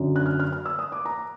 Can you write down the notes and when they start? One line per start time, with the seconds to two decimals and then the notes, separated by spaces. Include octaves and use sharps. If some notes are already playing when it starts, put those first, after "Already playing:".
Already playing: F#2 D3 F#3
0.16 F#6
0.26 F6
0.40 F6
0.53 F6
0.66 E6
0.79 D#6
0.92 D6
1.05 A#5